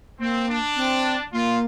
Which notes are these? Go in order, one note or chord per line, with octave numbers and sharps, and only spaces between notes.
A#3 C4
D4
C4
A#3 F4